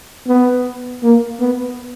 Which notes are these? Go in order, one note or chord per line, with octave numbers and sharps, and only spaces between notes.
B3
A#3
B3